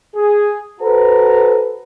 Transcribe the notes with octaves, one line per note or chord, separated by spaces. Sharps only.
G#4
F#4 A4 B4 C5 A#5